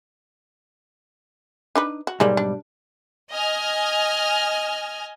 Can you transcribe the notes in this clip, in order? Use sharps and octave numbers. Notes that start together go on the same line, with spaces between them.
D4 D#4 B4
F#4
B1 G#2 G3 G#3 A#3
D4
D#5 G#5 F6